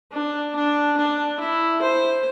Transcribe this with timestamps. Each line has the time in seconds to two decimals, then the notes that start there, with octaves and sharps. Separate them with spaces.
0.12 D4
0.55 D4
0.97 D4
1.40 E4
1.82 C5